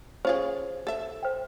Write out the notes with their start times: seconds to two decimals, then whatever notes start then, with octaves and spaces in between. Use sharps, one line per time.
0.25 C#4 F4 G#4 C5
0.87 A4 E5
1.23 C5 G5